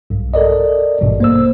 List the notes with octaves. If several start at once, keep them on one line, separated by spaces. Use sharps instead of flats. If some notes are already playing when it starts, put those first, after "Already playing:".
B1 G2
A4 A#4 D5 D#5
A1 G2 B2
A#3 C5 E6